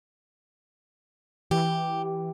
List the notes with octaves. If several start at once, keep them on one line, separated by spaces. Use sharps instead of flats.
E3 G4